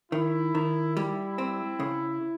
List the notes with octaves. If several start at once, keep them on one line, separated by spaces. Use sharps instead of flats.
D#3 E4
D#3
G3 E4
C4
C#3